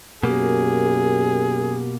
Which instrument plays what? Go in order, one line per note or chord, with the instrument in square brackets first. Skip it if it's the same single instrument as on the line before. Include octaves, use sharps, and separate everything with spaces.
[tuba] F#2 [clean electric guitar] B2 A#3 [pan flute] G4 [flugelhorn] G#4